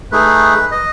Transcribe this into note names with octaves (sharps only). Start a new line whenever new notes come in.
A3 D#4 G#4 B4
D#5